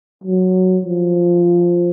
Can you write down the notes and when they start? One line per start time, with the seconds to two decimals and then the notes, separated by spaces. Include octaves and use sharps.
0.24 F#3
0.85 F3